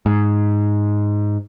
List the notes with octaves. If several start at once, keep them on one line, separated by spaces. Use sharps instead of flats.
G#2